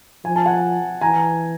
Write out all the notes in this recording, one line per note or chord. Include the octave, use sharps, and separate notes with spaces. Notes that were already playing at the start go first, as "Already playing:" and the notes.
F3 G#5
A5
F#5 G#5
E3 G#5 A#5